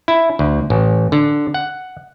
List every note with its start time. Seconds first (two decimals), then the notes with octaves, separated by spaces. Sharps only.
0.08 E4
0.39 D2
0.70 A1
1.12 D3
1.54 F#5